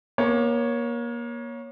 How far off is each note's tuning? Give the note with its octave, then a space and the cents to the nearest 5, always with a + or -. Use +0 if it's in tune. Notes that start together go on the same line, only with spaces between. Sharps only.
A#3 +30 C#5 +0